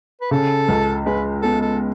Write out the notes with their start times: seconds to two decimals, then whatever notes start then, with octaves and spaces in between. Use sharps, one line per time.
0.21 B4
0.31 C#3 A4
0.68 C#2
1.06 G#3 B4
1.42 B3 A4
1.61 A4